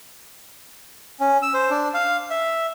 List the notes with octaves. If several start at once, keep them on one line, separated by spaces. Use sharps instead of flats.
C#4
E6
C5
D4
F5
E5